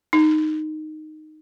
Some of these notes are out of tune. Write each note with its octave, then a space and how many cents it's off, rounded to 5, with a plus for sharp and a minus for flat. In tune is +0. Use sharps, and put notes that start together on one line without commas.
D#4 -10